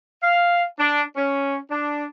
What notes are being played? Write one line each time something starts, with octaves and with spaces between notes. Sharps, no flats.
F5
D4
C#4
D4